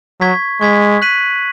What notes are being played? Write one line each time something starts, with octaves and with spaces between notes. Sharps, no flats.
F#3 C#6 G#6 B6
G#3 C#6 G#6 B6
F#6 B6 D#7 F#7